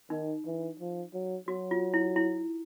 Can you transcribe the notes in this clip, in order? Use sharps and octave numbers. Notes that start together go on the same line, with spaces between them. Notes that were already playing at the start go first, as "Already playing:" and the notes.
D#3 D#4
E3
F3
F#3
F#3 F#4
F4
E4
E4